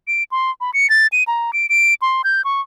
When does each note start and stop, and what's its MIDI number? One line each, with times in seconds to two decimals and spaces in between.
0.08 0.24 98
0.32 0.51 84
0.61 0.71 83
0.74 0.89 97
0.90 1.07 93
1.12 1.23 99
1.27 1.51 82
1.53 1.66 98
1.69 1.94 98
2.02 2.22 84
2.24 2.44 91
2.45 2.61 85